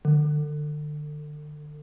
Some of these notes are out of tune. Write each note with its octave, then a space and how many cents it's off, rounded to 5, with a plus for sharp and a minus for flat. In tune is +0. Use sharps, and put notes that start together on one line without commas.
D3 +30